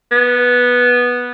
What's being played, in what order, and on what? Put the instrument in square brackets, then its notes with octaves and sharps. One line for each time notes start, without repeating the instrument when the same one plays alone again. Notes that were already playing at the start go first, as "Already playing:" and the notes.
[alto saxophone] B3